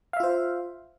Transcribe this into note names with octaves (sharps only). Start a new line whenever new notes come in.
F4 C5 E5 F5